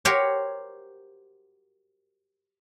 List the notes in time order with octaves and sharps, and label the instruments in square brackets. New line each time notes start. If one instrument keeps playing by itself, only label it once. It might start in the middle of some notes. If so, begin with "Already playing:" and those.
[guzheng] F#4 G4 A#4 C5 C#5